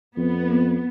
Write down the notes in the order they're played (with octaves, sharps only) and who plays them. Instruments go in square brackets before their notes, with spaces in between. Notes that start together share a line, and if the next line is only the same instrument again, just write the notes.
[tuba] F2 [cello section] B3